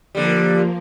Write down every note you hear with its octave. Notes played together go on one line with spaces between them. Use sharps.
D3 F3 G3 A#3